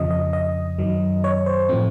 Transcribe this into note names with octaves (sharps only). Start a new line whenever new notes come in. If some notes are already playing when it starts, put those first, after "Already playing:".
Already playing: F2 C#3 F3 D#5
D#5
D#5
F#2 D#3 F#3
C#5
C5
A2 F3 A3 C4